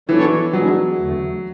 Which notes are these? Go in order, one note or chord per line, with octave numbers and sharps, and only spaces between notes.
E3 F#3 B3 D4 A4 C#5
F#3 G#3 B3 D4 G#4
E2 D3 A3